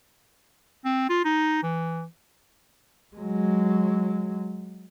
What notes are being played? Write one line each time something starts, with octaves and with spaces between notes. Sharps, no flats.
C4
F4
D#4
E3
F#3 G#3